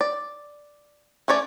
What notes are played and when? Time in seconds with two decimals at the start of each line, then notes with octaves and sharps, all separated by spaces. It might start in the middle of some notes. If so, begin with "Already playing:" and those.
0.01 D5
1.28 A3 C#4 C#5 D5